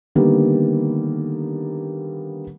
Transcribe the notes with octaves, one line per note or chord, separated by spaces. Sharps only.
D3 D#3 G3 A#3 B3